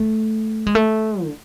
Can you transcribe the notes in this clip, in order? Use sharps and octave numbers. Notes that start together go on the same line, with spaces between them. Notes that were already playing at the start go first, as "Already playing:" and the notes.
Already playing: A3
G#3
A3
D3